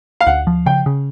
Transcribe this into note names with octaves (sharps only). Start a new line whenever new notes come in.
F5
D2 F#5
F3
C#3 G5
C#3